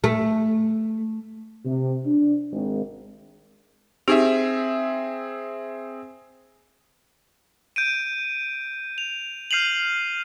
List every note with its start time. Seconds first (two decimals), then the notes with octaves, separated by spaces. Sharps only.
0.04 A3
1.65 C3
2.05 D4
2.52 G#1
4.08 C4 D#4 G4 G#4 E5
7.76 G6 D7 D#7
8.98 F7
9.51 F6 G6 C7 D#7 F7 F#7